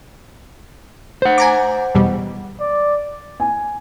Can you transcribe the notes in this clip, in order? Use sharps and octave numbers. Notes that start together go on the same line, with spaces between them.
C5 F#5
G#5 A#5 D6
E2 B2 G3
D5
G#5